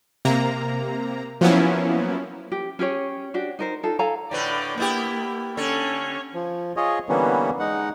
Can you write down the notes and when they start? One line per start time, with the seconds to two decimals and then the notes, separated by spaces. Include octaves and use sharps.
0.25 C3 A#3 A#5
1.41 F3 F#3 A#3 B3 C#4 E4
2.52 G4
2.79 C#4 G4 G#4 C#5
3.34 D4 F#4 G4
3.59 D#4 A#4 C5
3.83 D#4 F4 A4 F5
3.99 A4 F5 G#5 A#5
4.31 A2 D3 B4 D5 G5
4.77 A#3 B3 E4 G4
5.57 D3 C#4 A4 C#5
6.34 F3
6.77 F4 G#4 C#5 D#5
7.09 D3 E3 G3 A#3 B3 C#4
7.60 G#3 D#4 F#5